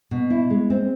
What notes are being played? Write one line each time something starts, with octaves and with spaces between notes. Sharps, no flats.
B2
E4
G#3
C4